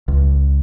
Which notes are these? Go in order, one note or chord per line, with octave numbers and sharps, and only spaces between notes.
C#2